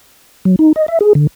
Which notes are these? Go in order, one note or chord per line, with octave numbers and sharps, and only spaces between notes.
F#3
D#4
D#5
E5
G#4
D3